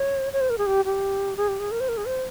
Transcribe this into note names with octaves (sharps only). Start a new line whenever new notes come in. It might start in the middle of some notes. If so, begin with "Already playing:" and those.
Already playing: C#5
C#5
C5
A#4
G#4
G4
G4
G#4
G4
G#4
A#4
C5
A#4
G#4
C5